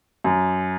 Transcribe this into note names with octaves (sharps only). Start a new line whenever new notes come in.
F#2